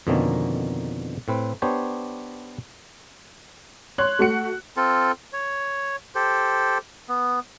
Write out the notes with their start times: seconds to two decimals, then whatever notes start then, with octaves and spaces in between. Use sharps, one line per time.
0.07 F2 B2 D3 D#3 A#3 C#4
1.28 A2 C4 B4
1.62 B3 D4 G4 C5 C#5
3.98 C#5 C6 F#6
4.19 A3 F#4 C#7
4.77 C4 F4 A4
5.33 C#5
6.15 G4 A4 C5
7.09 B3